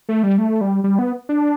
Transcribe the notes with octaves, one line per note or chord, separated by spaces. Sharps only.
A3
G3
A3
G3
G3
B3
D4